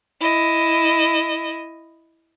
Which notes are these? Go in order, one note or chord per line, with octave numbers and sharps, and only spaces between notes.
E4 D#5